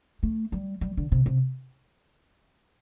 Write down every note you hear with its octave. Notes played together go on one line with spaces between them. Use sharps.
A3
G3
G3
D3
C3
C3